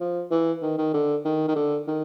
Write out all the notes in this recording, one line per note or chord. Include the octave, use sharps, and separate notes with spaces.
F3
E3
D#3
D#3
D3
D#3
D#3
D3
D#3